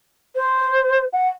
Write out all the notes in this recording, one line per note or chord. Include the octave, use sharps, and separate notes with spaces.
C5
F#5